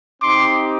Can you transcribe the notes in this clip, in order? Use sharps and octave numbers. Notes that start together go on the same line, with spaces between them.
C4 D#4 G4 C6 D6